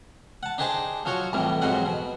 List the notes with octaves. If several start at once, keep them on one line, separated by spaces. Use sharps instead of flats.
F#5 A5
D4 D#4 G4 G#4 C5 D6
F3 F#3 F#4 C#5
C2 F2 A2 E3 G3
F2 G#2 F#3 C4 D#5 F#5
B2